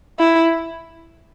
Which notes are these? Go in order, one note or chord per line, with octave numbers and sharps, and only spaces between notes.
E4